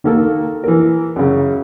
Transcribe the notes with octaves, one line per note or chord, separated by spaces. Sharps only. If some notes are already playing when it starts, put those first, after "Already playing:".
D#3 A#3 A4 A#4
E3 A#4
F#2 C#3